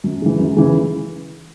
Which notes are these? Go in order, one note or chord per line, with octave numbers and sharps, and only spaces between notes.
F#2
C#3 E3
F#2
C#3 E3